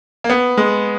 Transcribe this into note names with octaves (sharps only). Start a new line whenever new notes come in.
A#3
B3
G#3